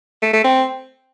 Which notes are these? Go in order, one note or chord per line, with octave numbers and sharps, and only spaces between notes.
A3
A3
C4